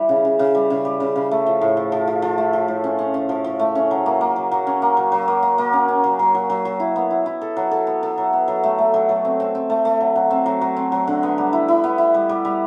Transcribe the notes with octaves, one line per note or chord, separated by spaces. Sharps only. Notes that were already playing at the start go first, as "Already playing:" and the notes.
Already playing: E3 G3
C#3
C#3
C#3
G3
C#3
G3
C#3
C#3
A3
F3
A2
F3
F3
F3
F3
A3
F3
A2
C#4
C#4
C#4
F3
F3
A3
C#4
F#3
A#3
A#3
F#3
F#3
C#4
A#3
F#3
F#3
A#3
A#3
A#3
C#4
C#4
F#3
F#3
F#3
F#3
F#3
E4
B3
E4
E4
A4
F#3
A4
B3
A4
F#3
B3
F#3
A3
A3
F#3
F#3
C4
C4
C4
A3
A3
F#3
F#3
C4
F#3
F#3
C4
F#3
D3
B3
G3
E4
E4
B3
E4
G3
G3
G3